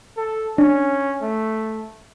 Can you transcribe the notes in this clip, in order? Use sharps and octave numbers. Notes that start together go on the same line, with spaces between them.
A4
C#4 D4
A3